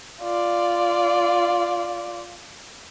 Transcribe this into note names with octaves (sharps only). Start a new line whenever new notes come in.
F4 D5